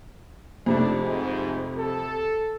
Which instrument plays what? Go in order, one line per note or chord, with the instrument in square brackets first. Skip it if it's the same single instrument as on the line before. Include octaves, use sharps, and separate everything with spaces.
[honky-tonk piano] F2 C3 A3 [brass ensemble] D4 D#4
[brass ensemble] G#2
A4